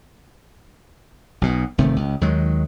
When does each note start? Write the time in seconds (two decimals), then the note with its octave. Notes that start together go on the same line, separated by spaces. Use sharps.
1.41 B1 B2
1.78 G1 C3 D#3 A3
1.96 C#2
2.21 D#2 D#3 F#3 G#3